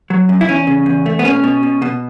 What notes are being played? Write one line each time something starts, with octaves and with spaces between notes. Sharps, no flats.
F#3
F#2
E4
E2 C#4
C#3
E2
A3
B3
B2 C#4
B2
B2
B2